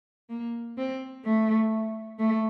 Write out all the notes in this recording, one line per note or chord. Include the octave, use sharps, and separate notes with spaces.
A#3
C4
A3
A3